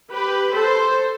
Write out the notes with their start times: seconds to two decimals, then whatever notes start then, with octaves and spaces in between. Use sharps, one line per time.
0.12 G4 B4
0.56 A4 C5